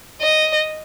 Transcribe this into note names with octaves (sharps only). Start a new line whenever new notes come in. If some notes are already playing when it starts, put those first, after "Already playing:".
D#5